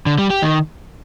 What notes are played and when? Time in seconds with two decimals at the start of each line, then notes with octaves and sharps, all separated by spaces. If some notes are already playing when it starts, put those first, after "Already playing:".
0.06 D3
0.18 G3
0.30 G4
0.42 D#3